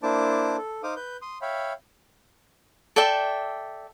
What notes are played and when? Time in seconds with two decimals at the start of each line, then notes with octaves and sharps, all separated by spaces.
0.03 A#3 D4 E4 C5 A5 D6
0.58 A4
0.83 D#4 C5 F5 D6 D#6
0.96 B4 G6
1.22 C6 D#6
1.42 C#5 E5 F5 G5 B5
2.96 A4 D5 E5 G5